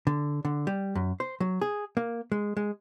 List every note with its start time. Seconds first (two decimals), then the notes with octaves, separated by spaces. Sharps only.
0.07 D3
0.45 D3
0.67 G3
0.95 F#2
1.20 C5
1.40 F#3
1.61 G#4
1.97 A#3
2.32 G#3
2.57 G#3